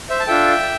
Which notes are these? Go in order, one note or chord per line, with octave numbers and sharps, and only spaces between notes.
C5 E5
A5
D4 F4 A4 E5 G5